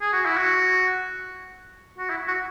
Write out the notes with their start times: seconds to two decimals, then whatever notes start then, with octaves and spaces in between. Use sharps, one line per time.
0.01 G#4
0.13 F#4
0.26 E4
0.37 F#4
1.98 F#4
2.10 E4
2.28 F#4